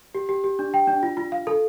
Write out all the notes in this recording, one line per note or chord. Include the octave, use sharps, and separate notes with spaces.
G4
G4
G4
D4
G5
D4
F4
F4
F5
A4